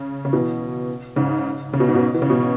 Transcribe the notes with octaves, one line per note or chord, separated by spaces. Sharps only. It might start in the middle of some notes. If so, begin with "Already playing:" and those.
Already playing: C#3
C#3
B2 E3
G#2 C#3
C#3
B2
G#2
B2
E3
C#3
B2